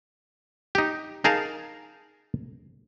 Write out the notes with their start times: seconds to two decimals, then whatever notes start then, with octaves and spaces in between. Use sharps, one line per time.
0.75 D#4 G4
1.24 D#4 G#4 A#4 F5 A5